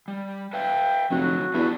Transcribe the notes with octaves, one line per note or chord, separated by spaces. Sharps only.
G3
B4 E5 F5 G5
F1 D3 F#3 F#4
E2 D4 F4 G4